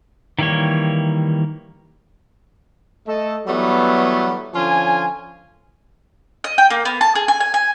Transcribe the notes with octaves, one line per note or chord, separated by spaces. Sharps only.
D#3 E3 G3 A#3 C#5
A3 A4 D#5
E3 F#3 G3 A3 B3
D3 F3 C#4 F4 G#5
D#5
G5
A#3
B3
A5
G#4
G#5
G#5
G#5